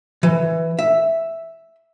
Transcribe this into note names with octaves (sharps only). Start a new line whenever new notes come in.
E3
E5